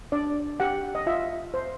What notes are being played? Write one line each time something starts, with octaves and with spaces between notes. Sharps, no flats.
D4 D5
G4 F#5
D#5
F4 E5
C5